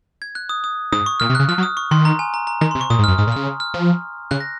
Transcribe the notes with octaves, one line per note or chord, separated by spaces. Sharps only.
G#6
F#6
D#6
D#6
G#2 D#6
C#6
A#2 F6
C3
C#3 F#6
F3 F6
F#3
D#6
C#6
D#3 C6
A#5
G#5
A#5
A#5
D#3 A#5
C6
C3
C#6
A#2 D#6
G#2
F#2 F6
G#2 D#6
A#2
C#3 F6
F6
F3
C#3 F#6
A#6